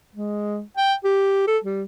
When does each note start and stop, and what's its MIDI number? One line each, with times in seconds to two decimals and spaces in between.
0.15 0.61 56
0.77 0.94 79
1.04 1.43 67
1.47 1.58 69
1.64 1.83 55